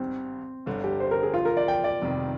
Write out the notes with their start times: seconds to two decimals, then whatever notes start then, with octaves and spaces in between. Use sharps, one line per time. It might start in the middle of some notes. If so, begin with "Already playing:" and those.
Already playing: G#1 G2 D#3 G3 C4
0.66 G1 G2 D3
0.84 G4
1.00 C5
1.11 A#4
1.23 G#4
1.34 F4
1.45 A#4
1.57 D5
1.68 G5
1.84 D5
2.02 F1 F2 C3 D#3 G3